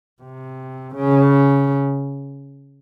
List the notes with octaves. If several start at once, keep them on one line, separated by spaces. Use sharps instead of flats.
C3
C#3